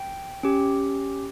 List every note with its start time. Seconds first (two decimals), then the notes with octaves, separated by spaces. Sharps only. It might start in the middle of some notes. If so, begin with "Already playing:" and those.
Already playing: G5
0.43 C#4 G4